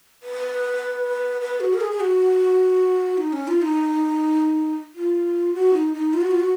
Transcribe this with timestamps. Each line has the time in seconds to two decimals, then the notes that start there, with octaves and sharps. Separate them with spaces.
0.23 B4
1.41 B4
1.60 F#4
1.74 A#4
1.81 G#4
1.91 G#4
2.00 F#4
3.17 D#4
3.33 C#4
3.47 F4
3.62 D#4
4.94 F4
5.54 F#4
5.73 D#4
5.93 D#4
6.13 F4
6.21 F#4
6.31 F4
6.40 F#4